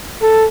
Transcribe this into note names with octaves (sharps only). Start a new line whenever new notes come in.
A4